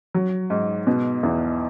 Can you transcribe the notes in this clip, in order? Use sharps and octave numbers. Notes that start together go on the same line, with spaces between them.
F#3
G#2
B2
E2